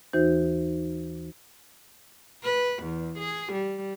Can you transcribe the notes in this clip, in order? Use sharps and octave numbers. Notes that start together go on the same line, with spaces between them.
D#2 E3 D#4 F#4 C5 G6
B4
E2
G#4
G3